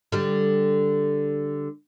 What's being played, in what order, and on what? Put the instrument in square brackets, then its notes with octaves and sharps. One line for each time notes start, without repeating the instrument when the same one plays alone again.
[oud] D3 G3